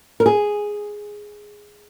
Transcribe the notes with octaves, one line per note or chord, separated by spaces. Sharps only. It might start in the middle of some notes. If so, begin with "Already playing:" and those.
A#4
G#4